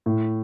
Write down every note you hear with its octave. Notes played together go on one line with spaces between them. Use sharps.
A2